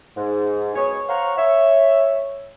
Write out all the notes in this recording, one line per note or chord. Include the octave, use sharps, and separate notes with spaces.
G#2
F#3 B3 G#4 C#5
C5 C#5 F5 F#5 A#5 C#6
C#5 E5